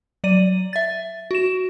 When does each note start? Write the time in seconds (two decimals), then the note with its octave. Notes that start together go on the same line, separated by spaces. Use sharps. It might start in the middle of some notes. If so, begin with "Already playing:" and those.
0.24 F#3 D5 D#7
0.73 E5 A6
1.31 F#4 E7